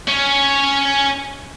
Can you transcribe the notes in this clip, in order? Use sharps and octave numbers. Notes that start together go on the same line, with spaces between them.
C#4